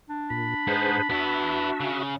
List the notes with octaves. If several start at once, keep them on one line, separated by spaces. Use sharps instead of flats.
D4
A#2 B5
G#2 G#4 B4 C5
B3 D4 E4 F#4 E5
C#3